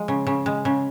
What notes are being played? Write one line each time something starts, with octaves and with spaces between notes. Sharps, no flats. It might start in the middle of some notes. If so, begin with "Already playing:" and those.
Already playing: F3 G#3
C#3
C#3
G#3
C#3